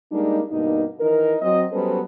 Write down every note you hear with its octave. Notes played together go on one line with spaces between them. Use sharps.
G3 G#3 A#3 D4 D#4
G2 B2 A#3 D#4
D#3 E3 D#4 A#4
F#3 C4 D#5
F#3 G3 B3 C#4 A4 C5